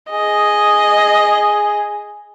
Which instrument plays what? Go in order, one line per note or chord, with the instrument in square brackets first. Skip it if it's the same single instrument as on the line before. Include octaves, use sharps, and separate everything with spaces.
[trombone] G#4 [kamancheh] D#5